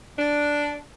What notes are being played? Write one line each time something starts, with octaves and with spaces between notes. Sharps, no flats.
D4